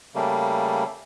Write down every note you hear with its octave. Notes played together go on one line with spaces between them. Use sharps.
C#3 G3 A3 A#3